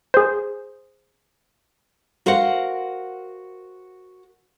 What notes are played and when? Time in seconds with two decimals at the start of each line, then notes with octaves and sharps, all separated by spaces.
0.14 G#4 C5
2.26 F#4 A#4 C5 F5 F#5